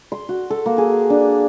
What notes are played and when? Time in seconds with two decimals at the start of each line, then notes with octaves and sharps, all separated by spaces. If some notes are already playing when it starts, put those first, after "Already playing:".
0.12 C6
0.29 F#4
0.50 A4
0.66 A#3
0.78 G#4
1.10 D4